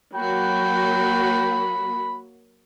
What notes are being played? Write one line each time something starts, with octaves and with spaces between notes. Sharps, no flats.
F#3 A#3 F#4 G5 B5